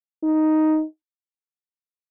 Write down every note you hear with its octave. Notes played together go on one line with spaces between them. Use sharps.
D#4